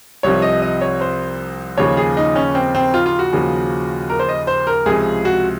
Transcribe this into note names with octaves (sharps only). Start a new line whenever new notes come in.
C2 C3 F3 C#5
D#5
D#5
C#5
C5
D#2 C#3 F3 C#5
G#4
D#4
C#4
C4
C4
F4
F4
F#4
D#2 C#3 F3
A#4
C5
D#5
C5
A#4
C#2 C3 F3 G#4
F#4